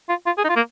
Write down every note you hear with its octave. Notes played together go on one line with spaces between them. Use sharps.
F4
F4
G#4
D#4
F4
A#3